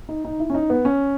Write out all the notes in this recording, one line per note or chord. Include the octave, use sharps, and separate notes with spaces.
D#4
D#4
E4
C#4
D#4
B3
C#4